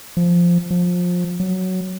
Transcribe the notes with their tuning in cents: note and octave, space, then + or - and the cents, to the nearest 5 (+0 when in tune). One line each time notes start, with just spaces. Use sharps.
F3 -5
F3 +25
F#3 +5